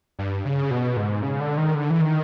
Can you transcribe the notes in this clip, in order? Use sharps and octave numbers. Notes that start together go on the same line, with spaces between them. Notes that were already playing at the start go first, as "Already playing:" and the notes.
G2
C#3
B2
G#2
C#3
D3
D#3
D3
E3
D#3